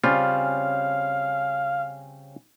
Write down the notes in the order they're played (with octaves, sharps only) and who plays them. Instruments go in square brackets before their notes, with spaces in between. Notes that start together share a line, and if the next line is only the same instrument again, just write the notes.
[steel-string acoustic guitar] C#3 C4 C#4 [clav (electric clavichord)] G3 F4 [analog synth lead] F5